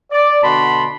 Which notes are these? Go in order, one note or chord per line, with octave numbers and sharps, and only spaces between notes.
D5
B2 D3 F#4 A5 B5 C6